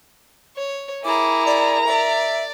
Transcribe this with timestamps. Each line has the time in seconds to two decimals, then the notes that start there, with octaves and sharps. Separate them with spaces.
0.56 C#5
1.04 E4 G#4 A#4 A#5 D6
1.46 D5
1.86 D5 E5